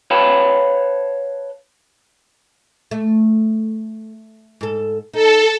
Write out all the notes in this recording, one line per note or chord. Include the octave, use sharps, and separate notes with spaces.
B4 C#5 F5 G5 A5 B5
A3
G#2 A4
D#4 A4